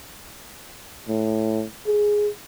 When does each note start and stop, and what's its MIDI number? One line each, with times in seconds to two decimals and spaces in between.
1.08 1.64 45
1.87 2.28 68